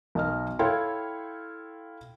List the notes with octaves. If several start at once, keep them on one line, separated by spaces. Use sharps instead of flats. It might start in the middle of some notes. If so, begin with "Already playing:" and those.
B1 D#5 F6
E4 A4 C#5 F5 G5 C6